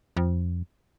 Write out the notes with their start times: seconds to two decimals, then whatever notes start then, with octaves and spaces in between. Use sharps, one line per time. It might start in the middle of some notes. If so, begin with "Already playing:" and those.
0.17 F2